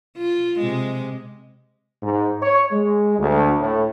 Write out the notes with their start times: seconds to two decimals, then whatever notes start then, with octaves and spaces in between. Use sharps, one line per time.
0.18 F4
0.60 C3 G#3
2.03 G#2
2.42 C#5
2.71 G#3
3.19 D2
3.60 A2